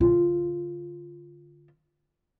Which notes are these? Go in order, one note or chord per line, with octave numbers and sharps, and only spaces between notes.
D3 F4